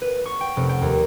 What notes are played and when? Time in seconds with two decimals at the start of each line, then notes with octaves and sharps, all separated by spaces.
0.01 B4
0.26 C#6
0.41 G5
0.56 F1
0.69 G5
0.81 D#2